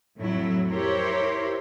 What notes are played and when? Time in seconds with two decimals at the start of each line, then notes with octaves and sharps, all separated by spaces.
0.17 F2 A2 F#3 E4
0.70 E4 G4 A#4 C5 C#5